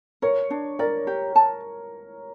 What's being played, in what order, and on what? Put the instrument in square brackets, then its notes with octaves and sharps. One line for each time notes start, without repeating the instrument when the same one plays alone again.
[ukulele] A#4 [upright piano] C#5
[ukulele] D4
[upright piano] A#4 [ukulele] D5
[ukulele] G4
A5